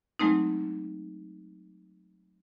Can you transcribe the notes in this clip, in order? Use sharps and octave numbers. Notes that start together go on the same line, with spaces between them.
F#3 G#3 A3 C4 D#4